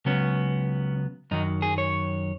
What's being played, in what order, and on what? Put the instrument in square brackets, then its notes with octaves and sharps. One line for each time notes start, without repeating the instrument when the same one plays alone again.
[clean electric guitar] C#2 C#3 F#3 B3 C#4
F#2 D#3 F#3 D#4
G#4
C#5